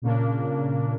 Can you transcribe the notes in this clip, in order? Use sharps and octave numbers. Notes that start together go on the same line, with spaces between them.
A#2 C#3 A#3 D4